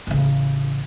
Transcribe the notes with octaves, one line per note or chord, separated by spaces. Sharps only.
A1 C#3